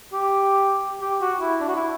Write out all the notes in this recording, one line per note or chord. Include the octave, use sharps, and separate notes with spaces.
G4
G4
F#4
E4
D4
F#4
E4